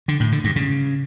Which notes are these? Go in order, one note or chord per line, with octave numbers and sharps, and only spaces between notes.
D3
A2
D3
G2
C#3